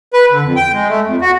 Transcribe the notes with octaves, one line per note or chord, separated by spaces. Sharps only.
B4
D3
F2
G5
G#3
A3
F2
F#4